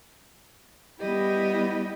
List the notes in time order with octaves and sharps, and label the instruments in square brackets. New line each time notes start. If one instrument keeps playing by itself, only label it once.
[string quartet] G3 B3 E4 G4 D#5